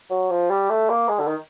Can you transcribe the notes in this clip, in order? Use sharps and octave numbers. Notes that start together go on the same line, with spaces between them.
F#3
F3
G3
A3
A#3
G#3
D3
D#3